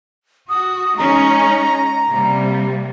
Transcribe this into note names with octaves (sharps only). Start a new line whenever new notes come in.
F#4 D#6
G#3 C#4 D#4 A#5
C3 G3 A#3